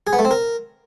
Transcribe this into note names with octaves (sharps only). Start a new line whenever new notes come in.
G#4
B3
A3
C4
A#4